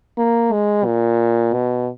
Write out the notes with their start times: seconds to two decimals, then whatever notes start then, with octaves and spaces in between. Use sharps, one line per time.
0.18 A#3
0.52 G#3
0.85 A#2
1.53 B2